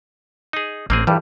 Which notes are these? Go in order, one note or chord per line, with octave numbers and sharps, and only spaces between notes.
D#4 G#4
A1 A#3 C4 G#4
A#1 G2 E3 G3